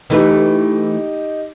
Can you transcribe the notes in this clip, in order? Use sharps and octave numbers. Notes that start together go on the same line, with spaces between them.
E3 A3 D#4 G4 B4